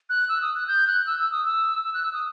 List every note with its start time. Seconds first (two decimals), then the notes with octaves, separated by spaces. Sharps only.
0.10 F#6
0.29 E6
0.42 D#6
0.55 F#6
0.68 G6
0.87 F#6
1.07 E6
1.19 E6
1.32 D#6
1.45 E6
1.84 E6
1.94 F#6
2.04 E6
2.13 D#6